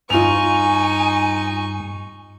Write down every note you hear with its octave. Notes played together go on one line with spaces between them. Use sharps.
G2 D#4 F4 G#5 C#6 F7